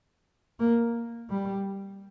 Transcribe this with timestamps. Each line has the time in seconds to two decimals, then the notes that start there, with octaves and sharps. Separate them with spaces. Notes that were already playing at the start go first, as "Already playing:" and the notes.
0.60 A#3
1.30 G3